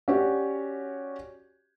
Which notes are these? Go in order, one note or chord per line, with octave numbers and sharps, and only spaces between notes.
C#4 F#4 G4 C#5 D5